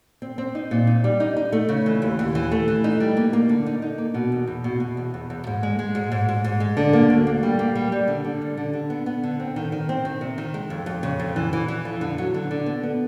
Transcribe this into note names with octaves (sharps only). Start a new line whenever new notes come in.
C4
C4
D#4
A#2
D#4
G3
D#4
D#4
A3
C#3
E3
D#2
D#2
E3
A3
E3
D#4
G3
A#3
A#3
D3
D#4
D#4
A#3
B2
E2
E2
B2
B2
E2
E2
E2
G#2
G#3
G#3
G#2
G#2
G#2
G#2
G#3
D3
A#3
D2
A#3
G3
A#3
G3
G3
D3
D3
G3
D3
D3
B3
B3
D3
C4
D#3
D#3
C4
D#3
C3
D#3
G#3
F2
F2
C#3
F2
E3
E3
E3
F2
D3
F#3
D3
D3
B3
B3